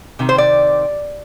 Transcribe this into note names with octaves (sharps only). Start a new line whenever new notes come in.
C3 D#3
C5
D5